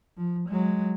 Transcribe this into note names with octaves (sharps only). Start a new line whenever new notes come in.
F3
F#3 G#3